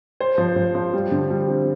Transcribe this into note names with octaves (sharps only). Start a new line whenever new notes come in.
C5
F3
F3
F3
G3
D3
G3
C4